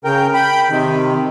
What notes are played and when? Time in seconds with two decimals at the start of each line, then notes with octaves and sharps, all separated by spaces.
0.05 C#3 A#4 G5
0.34 G5 B5
0.70 C3 D#3